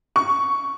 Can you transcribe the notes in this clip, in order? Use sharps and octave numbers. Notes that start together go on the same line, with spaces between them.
C#6